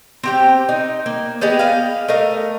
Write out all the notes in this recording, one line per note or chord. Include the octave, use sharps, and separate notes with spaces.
C4 G4 G5
D#4
A#3
B3 G4 G#4 D#5
D#5 F5
A3 A#4 D#5 F5